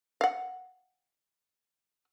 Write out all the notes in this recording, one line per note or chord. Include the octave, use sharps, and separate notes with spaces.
F5 F#5